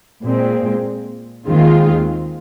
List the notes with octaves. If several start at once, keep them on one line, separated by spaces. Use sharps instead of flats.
A#2 G#3 C4
D#2 D#3 G#3 C4 F4